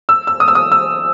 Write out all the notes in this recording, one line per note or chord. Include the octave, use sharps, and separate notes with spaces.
E6
E6
D#6
E6
D#6
E6